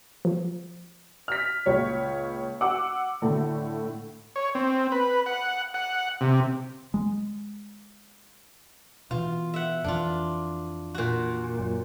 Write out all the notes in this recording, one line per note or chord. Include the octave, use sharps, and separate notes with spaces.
F3
F6 B6
C#2 A#2 C#5
F#5 D6 E6
A2 D3 A3
C#5
C4
B4
F#5
F#5
C3
G#3
B2 E3 F4
E5 F#5
F2 E3 D4 F4
A#2 F#4
F#2